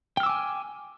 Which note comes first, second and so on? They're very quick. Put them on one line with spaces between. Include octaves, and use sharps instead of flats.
G5 F6 E6 D6 G#5